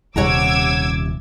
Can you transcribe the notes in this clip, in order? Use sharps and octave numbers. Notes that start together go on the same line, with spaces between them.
D#1 C3 C#5 F#5 A#5 D6 E6 G#6